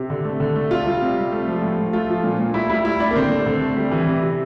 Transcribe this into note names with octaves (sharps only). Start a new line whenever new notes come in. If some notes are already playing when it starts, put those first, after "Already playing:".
Already playing: C3
D3
A3
D3
A3
C3 F4
G3
C3
G3
A3
F3
A2
A2
A3 F4
F3
A#2
A#2
A2 E4
G3 E4
A2 E4
G3 D4
A#3
D3 C4
A3
D3
A3
G3
E3
C3
C3